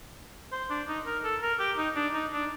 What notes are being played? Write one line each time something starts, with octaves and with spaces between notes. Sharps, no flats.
C5
D4
D#4
A#4
A4
A#4
G4
D#4
D4
D#4
D4